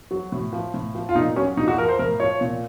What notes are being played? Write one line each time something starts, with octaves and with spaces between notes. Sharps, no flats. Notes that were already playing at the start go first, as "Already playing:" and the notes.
F#3
A2
F3
A2
F3
F4
A#2 D#4
F#3 C#4
A#2 D#4
F#4
F3 A#4
C5
A2 A#4
F3 C#5
A#2